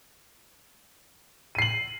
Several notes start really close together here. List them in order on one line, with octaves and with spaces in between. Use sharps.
D#7 C7 F#7